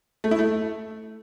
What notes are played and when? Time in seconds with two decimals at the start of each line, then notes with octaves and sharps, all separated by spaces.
0.24 A3
0.31 E4
0.39 A3